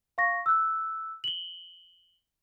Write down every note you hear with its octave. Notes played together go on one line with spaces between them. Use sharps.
F5 C#6 A#6
E6 F#6
F#7 G7